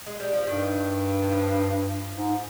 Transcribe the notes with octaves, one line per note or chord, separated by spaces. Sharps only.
G#3
G3
F3
G2 D#3
D#3
F3
G#2